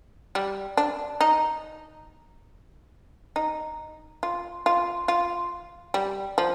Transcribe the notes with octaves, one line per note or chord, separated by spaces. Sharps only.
G3
D4
D#4
D#4
F4
F4
F4
G3
F3